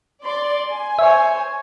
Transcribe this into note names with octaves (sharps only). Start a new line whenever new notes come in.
D5 C6
G#5
C5 C#5 E5